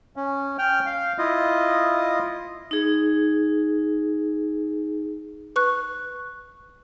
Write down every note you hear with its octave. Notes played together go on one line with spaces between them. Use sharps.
C#4
G5 F6
F5
E4 F4 D#5
D#4 G#4
B4 C#6 F#6